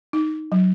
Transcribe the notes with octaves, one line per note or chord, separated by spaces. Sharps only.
D#4
F#3